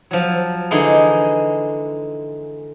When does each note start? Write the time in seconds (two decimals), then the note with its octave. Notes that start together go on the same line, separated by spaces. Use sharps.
0.11 F3 F#3
0.71 D3 E3 G#3 D#4